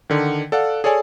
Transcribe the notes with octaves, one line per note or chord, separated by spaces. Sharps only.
D3 D#3
A4 D5 F5 F#5
G#4 A4 C#5 D5 G#5